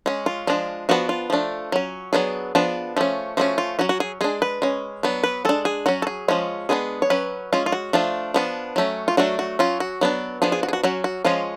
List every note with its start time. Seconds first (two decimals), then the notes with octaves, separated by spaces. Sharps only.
0.06 G#3 C#4
0.26 F4
0.47 F3 G#3 D4
0.89 F3 B3 D4 F#4
1.09 F4
1.30 F3 A3 D4
1.72 F#3 C#4
2.13 F#3 B3 D4 G#4
2.55 F3 B3 D4
2.97 F3 A3 C#4
3.37 F3 A3 C#4 F#4
3.58 F4
3.79 F#3 C#4 F#4
3.89 F#4
4.00 G#4
4.21 G#3 D4 G#4
4.42 B4
4.62 G#3 C#4
5.03 F#3 B3 D4
5.24 B4
5.45 G#3 D4 A4
5.65 G#4
5.86 F#3 C#4 F#4
6.02 A4
6.07 G#4
6.28 F3 G#3 C#4
6.69 G#3 B3 D4 G#4
7.02 C#5
7.10 F#3 C#4 B4
7.53 G#3 C#4 F4
7.66 F4
7.72 F#4
7.93 F3 A3 D4 F4
8.34 F3 B3 D4
8.76 F#3 A3 C#4
9.08 F4
9.17 F#3 A3 D4 F#4
9.39 F#4
9.59 F#3 C#4 F4
9.80 F#4
10.01 F#3 B3 D4
10.42 F3 B3 D4 G#4
10.52 G#4
10.63 F#4
10.69 G#4
10.73 F#4
10.83 F#3 C#4 F#4
11.04 F#4
11.25 F3 G#3 C#4 F4